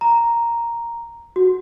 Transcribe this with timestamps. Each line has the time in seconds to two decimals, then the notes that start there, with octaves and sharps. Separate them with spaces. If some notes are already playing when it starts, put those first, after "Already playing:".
0.01 A#5
1.36 F#4